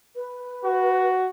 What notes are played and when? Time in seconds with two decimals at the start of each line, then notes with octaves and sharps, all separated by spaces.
0.16 B4
0.64 F#4